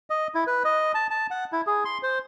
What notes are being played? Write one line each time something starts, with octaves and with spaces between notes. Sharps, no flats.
D#5
E4
B4
D#5
A5
A5
F#5
E4
G#4
C6
C5